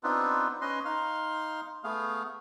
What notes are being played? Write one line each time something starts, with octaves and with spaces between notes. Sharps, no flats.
B3 C4 D4 D#4 F4 B4
C#4 B4 D#5 C6
D#4 F5 C6
A3 B3 G#4 F5